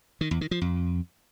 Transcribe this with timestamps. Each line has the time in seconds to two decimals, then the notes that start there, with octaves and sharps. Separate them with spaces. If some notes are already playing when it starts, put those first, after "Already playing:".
0.21 D#3
0.31 E2
0.41 D#3
0.51 F3
0.61 F2